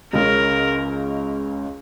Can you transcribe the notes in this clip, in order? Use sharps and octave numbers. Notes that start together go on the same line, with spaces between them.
C#2 C#3 G#3 C#4 A#4